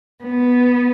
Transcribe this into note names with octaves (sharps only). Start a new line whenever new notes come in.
B3